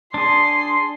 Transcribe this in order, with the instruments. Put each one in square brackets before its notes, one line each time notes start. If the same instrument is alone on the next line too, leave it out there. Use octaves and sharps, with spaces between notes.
[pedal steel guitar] D4 G#4 [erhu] C6